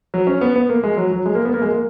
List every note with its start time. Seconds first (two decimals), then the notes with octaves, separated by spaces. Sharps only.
0.14 F#3
0.27 C#4
0.41 B3
0.56 B3
0.69 A#3
0.83 G#3
0.97 F#3
1.12 F#3
1.26 G#3
1.35 A#3
1.45 B3
1.54 A#3
1.62 G#3
1.70 A#3